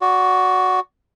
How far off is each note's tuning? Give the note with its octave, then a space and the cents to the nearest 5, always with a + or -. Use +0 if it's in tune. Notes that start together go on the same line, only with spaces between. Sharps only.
F#4 +0 D5 -25